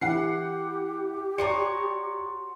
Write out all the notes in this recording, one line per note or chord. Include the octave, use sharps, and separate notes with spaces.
E3 E4 G4 F#5 C7
F4 F#4 C#5 D5 A#5 C#7